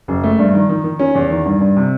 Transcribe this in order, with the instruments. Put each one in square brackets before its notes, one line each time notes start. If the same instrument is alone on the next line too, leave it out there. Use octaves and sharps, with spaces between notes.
[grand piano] F#1
A3
G2
D#3
D#3
D#3
C#4
E2
D#3
G2
G2
C3